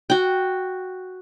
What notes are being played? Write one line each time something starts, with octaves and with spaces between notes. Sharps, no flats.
F#4 G5